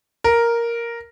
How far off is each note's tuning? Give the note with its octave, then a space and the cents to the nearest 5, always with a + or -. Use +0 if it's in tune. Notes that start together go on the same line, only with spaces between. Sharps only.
A#4 +0